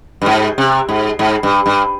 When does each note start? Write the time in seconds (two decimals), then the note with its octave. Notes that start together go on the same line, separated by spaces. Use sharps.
0.22 G2
0.26 G#2
0.58 C3
0.89 G#2
1.19 G#2
1.43 G2
1.66 G2